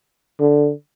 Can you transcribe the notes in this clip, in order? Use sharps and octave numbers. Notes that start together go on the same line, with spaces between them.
D3